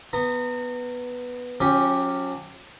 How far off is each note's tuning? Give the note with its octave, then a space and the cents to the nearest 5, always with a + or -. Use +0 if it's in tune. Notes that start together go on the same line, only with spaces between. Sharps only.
B3 +0 A#5 -35
F#3 -40 C#4 +0 G4 +0